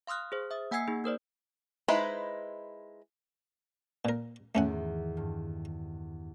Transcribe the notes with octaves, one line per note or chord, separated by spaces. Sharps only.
F5 C6 D#6 F6 F#6
G#4 C5
E5 D#6
A#3 F#5 G#5 E6 G#6 C7
A#3 D#4 G#4
A#3 A#4 C5 D5
G#3 D#4 E4 B4 C5
A#2 A#4
E2 G#2 D#3 A3 C#4 F#5
G2